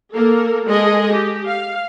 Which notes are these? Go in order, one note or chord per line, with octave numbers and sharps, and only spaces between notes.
A#3 A4 A#4
G#3 G#4 A4 D#5
G4
F5